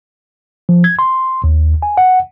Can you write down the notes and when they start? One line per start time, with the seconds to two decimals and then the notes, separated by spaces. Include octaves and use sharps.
0.69 F3
0.84 G#6
0.99 C6
1.44 D#2
1.82 G#5
1.97 F#5